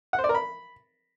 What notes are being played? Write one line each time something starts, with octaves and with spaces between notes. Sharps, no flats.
F#5
C5
D5
A#4
B5